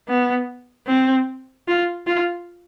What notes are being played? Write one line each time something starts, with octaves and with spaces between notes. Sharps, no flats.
B3
C4
F4
F4